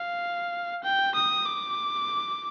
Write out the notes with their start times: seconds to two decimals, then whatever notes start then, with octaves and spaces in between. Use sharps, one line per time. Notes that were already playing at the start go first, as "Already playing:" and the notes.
Already playing: F5
0.83 G5
1.14 D#6
1.45 D6